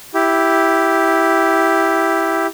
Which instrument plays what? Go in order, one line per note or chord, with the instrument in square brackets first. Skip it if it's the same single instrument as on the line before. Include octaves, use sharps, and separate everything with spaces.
[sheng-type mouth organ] E4 G4